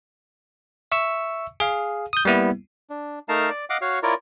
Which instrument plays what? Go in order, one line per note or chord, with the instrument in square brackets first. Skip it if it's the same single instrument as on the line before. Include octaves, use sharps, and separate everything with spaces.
[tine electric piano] E5 C#6 E6
G#4 F5
D#6 G6
G3 A#3 B3 E4
[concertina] D4
A3 D#4 A#4 F5 A5 A#5
D5
D#5 F5 F#5 D6
F#4 C#5 F5
E4 F4 A#4 C#5 D5